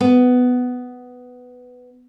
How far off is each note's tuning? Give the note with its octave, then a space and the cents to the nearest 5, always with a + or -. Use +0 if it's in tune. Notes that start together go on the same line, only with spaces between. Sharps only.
B3 +10